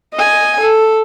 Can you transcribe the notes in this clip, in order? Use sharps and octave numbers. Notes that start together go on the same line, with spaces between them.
D#5 G#5
A4